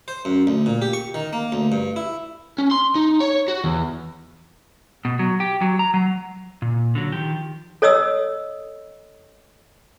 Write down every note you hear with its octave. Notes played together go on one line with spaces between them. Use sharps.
C5
F#2
D2
A#2
G4
C#6
D#3
A#3
D2
G2
E4
C#4
C6
D#4
C#5
F#4
E2
B2
F#3
G4
F#3
A#5
F#3
A#2
D3 F#3
D#3 F3 G4
A4 C#5 D#5 D#6 E6